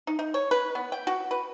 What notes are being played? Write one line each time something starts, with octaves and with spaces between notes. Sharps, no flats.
D#4
D#4
C#5
B4
B3
G5
F#4
B4